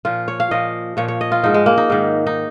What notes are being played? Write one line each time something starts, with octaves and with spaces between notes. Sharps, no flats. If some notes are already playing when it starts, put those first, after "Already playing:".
A#2 F3 F4
C#5
F5
A#2 F3 D#5
A#2 F3 C#5
C#5
D#5
F4
G#2 F3 D#4
G#3
A#3
D#4
G#2 D#3
D#4